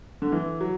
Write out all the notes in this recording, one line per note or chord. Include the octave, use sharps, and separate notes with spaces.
D3
E3
F#3